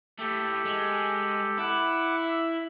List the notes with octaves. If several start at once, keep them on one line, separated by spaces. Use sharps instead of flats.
A2 A3 G4 A4
G#3
E4 F#5 D6
E5